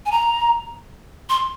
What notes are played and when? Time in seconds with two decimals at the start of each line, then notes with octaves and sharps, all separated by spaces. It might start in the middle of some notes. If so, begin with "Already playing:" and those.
0.06 G#5
0.11 A#5
1.29 C6